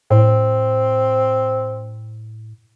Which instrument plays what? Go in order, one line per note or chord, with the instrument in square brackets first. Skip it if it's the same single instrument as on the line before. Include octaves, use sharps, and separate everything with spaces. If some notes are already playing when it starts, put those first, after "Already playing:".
[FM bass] A2 [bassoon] C4